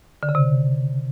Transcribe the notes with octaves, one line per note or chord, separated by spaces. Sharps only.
D3
C#3
C3